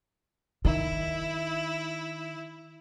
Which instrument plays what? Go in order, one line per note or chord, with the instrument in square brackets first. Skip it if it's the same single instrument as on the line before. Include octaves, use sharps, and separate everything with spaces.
[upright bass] D#3 [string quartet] E4